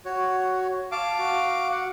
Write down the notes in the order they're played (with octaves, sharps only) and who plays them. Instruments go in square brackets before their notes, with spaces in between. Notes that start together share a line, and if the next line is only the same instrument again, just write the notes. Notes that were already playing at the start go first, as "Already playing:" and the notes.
[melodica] F#4 C#5
[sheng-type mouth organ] F5 D6 [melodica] A5
[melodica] F#4
[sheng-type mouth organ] F#5